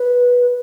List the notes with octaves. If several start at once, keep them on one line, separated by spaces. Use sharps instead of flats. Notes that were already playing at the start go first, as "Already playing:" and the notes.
Already playing: B4